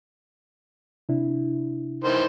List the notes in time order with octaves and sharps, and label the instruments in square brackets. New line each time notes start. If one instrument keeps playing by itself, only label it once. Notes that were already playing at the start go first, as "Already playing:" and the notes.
[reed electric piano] C3 D4 E4
[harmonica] D#3 E3 C5